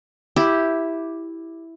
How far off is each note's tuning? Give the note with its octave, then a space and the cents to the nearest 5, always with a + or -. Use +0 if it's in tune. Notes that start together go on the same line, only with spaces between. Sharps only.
E4 +0 G4 +0